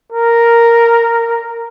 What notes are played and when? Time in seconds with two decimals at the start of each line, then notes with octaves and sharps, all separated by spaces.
0.12 A#4